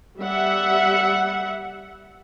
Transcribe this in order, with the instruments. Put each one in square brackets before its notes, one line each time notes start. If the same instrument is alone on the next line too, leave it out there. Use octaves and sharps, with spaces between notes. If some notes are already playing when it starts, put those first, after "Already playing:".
[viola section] G3 E5 F#5